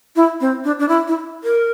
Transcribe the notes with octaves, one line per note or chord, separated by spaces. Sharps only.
E4
C4
D4
D4
E4
E4
A#4